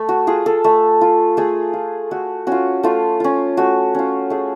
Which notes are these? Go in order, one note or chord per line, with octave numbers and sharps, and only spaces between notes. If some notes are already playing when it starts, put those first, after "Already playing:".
Already playing: A3 A4
F#4
F4 G#4
A4
A3
F4
A3 G#4
F4
A3 F#4
C#4 F4 F#4
A3 F4
C#4 F4
A3 F#4
C#4 F4
A3 G#4